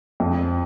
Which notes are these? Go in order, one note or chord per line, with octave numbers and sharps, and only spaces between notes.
F2